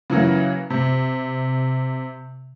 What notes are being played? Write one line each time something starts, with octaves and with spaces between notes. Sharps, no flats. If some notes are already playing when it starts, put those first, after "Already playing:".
C#3 E3 F#3 A#3
C3